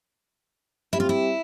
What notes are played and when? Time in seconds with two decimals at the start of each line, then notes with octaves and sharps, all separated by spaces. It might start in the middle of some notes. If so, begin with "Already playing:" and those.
0.92 G3 C4 E4 G4
1.00 F4
1.09 E4